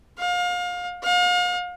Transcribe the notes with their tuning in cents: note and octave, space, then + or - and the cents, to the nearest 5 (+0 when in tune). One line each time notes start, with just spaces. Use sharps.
F5 +30
F5 +40